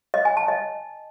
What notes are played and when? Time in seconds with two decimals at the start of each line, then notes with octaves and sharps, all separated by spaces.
0.14 D#5
0.25 G#5
0.37 A5
0.48 D#5